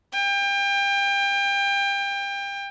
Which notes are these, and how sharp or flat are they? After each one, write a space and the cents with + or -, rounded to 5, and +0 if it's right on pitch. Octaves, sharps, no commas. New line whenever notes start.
G5 +30